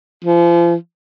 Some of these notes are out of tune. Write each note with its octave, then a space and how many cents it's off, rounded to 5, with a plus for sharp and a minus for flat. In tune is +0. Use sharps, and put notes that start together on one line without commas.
F3 -35